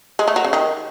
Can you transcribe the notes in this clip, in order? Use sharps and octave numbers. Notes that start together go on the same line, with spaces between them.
G#3
A3
F#3
C#3
D#3